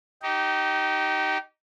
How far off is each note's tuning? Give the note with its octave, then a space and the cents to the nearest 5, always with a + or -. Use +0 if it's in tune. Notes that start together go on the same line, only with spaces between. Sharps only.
D#4 +0 G4 -25